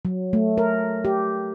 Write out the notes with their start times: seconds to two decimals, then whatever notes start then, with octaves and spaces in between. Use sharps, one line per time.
0.05 F#3
0.33 A3
0.58 A#4
1.05 G4